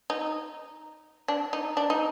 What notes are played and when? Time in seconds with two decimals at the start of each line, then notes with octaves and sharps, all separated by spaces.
0.10 D#4
1.28 D4
1.53 D#4
1.77 D4
1.90 D#4